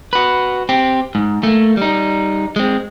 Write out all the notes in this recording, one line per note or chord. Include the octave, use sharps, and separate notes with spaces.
F#4 B4
C4 G4
G#2
A3 A#3
G3 D#4
G#3 C4